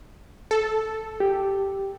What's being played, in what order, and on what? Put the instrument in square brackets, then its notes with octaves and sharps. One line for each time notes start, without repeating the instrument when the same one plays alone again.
[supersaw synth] A4
[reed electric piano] G4